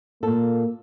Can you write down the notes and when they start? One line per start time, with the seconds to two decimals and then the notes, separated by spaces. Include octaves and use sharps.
0.23 A#2 A#3 A4